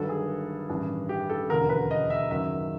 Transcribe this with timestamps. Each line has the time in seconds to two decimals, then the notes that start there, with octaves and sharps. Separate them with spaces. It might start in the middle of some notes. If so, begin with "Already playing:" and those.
Already playing: G1 G2 D#3 F#3 A4
0.09 G#4
0.70 A1 G2 D#3
1.09 G4
1.30 A4
1.49 E1 D#2 D3 F#3 A#4
1.69 B4
1.91 D#5
2.10 E5
2.30 F#1 F#2 D#3 F#3 E5